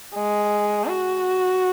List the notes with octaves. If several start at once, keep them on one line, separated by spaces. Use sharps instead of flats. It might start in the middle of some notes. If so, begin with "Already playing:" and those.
G#3
F#4